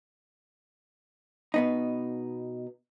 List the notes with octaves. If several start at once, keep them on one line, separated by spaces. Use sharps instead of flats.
B2 B3 D#4